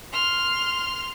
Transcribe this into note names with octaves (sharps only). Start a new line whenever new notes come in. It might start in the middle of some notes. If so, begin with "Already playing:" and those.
C6 F6